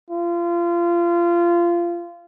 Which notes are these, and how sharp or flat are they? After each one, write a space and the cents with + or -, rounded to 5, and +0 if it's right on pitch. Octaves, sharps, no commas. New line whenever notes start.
F4 -25